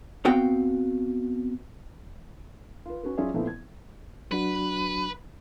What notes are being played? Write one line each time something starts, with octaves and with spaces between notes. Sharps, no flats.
B3 C4 F#4 F5 G5
F4 B4
C#4 F#4 B4
F#3 C#4 F4 G#4 D5 E5
A#2 F3 A3 B3 C4 E4
G#6
F#3 D4 F#4 B4